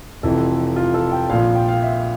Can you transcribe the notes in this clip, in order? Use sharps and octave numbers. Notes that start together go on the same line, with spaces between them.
F1 F2 E3 A4
F4
A4
G5
A#1 A#2 F3 F5
G5
F5
E5